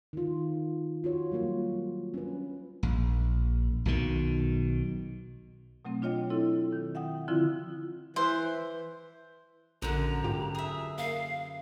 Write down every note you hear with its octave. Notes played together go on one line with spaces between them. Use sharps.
D#3 F4
F4 F#4 C#5
F#3 G3 A#3 F4
C#4 D4 B4
A#1
B1 B2 D#3
B2 F#3 A3 C4
D4 F4 C#5 D#5 G5
C4 E4 A4
D#3
E5 F#5 G5 D#6
D3 F3 C4 E4 F4
E3 C5
A#1 F#2 D3 A#5
G#2 F4 G4
G#4 E5
A#3 F5